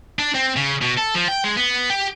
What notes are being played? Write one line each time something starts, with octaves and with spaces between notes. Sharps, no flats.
D4
C4
C#3
B2
A4
F3
G5
G#3
B3
G4